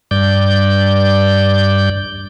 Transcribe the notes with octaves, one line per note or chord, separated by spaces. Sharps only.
G2 D5 G6